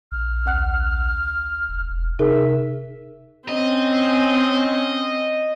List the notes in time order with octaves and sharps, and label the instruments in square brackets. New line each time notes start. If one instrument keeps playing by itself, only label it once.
[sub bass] A#1 [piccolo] F6
[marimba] D2 F#5 F#6
[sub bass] F1
E1
[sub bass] C3 [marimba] D#4 G#4 A#4 [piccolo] E5
[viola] C4 [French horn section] C#4 [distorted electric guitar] D#5